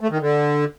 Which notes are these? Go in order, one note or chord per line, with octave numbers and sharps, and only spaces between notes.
A3
D#3
D3